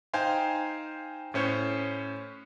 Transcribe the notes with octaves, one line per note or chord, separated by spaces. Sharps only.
D#4 C5 F5 G5 G#5 C6
A2 C#4 C5 C#5